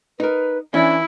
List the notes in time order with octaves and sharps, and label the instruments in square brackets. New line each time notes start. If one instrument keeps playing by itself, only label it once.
[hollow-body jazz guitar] D#4 A#4 [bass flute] B4
[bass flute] E3 [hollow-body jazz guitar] C#4 D4 [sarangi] E4